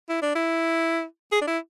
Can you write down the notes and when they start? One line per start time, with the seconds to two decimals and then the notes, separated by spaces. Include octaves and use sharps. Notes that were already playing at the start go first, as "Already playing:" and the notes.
0.09 E4
0.22 D4
0.35 E4
1.32 G#4
1.41 D4
1.47 E4